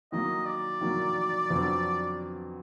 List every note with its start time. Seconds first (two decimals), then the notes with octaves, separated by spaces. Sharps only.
0.12 D#3 F#3 A#3 D#5
0.46 D5
0.81 D#3 F#3 A#3
1.50 F2 D3 F#3 B3